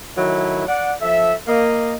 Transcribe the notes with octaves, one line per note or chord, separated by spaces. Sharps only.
D#3 F#3 A3 E4
D5 F#5
F3 A4 E5
A#3 D#5